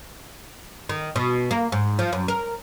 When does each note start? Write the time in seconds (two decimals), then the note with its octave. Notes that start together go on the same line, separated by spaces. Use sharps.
0.89 D#3
1.16 B2
1.51 A#3
1.72 G#2
1.99 F3
2.13 F#2
2.28 A#4